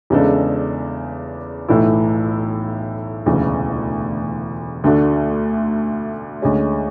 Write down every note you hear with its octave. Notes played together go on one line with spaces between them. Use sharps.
E2 C#3 G#3 D4 A4
B1 A2 E3 A3 E4
E1 D2 C#3 E3
D2 D3 A3 D4 F#4
D2 D3 G#3 C#4